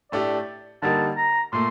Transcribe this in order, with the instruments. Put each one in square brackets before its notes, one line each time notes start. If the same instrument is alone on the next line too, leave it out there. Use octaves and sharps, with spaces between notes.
[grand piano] A2 A3 D4 G4 [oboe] D5
[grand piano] D3 G3 A#3 D#4 A#4 [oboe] A5
[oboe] A#5
[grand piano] A#2 A3 [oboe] C6